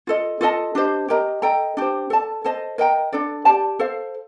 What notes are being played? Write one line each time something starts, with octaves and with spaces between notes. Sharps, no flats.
F4 A4 D#5
F4 A4 D#5 A5
D4 G4 C5 D#5
G4 A#4 D#5 A#5
A4 D#5 G5 A#5
D4 G4 C5
A4 D5 A5
A4 C5 D#5 A5
A#4 D#5 G5 A#5
D4 A4 D5
G4 D5 A5
A4 C5 F5